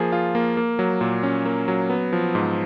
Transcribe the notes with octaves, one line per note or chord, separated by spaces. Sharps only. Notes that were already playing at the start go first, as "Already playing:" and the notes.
Already playing: F3 A#3 G#4
F4
A#3
A#3
F#3
A#2
C#4
A#3
F#3
B3
F3
G#2